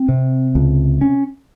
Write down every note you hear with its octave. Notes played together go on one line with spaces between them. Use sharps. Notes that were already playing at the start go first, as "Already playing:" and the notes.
Already playing: C4
C3
C#2
C#4